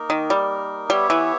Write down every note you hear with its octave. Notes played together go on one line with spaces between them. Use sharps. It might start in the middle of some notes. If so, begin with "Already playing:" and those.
Already playing: A#3 D#4 A#4
D#3
G3
G3 B3 G4 C#5 E5
E3